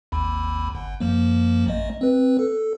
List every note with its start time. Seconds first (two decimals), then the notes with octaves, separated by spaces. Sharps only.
0.12 G#1 D#2 B5
0.75 G1
1.00 F#2 F3 A#3
1.66 A1 A3 D#5
2.01 C4 B4
2.39 A4